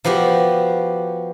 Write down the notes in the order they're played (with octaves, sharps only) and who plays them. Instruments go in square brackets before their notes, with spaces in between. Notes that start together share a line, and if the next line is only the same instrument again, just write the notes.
[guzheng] F3 B3 F#4 G4